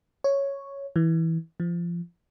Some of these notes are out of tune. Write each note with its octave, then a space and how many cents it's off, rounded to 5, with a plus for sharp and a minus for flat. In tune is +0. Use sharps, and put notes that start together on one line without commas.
C#5 +0
E3 -15
F3 -25